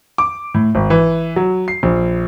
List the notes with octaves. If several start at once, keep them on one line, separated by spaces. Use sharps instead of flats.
D6
A2
G#1
E3
F#3
C7
A#1